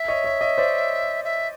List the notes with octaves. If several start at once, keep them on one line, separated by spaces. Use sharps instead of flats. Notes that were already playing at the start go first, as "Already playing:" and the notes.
Already playing: E5
C#5 D#5
C#5 D#5
C#5 D#5
C5 D5
E5